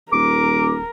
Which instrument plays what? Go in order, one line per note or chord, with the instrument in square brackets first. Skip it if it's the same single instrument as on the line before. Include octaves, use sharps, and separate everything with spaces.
[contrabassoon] D#1 [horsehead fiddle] A#4 [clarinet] D6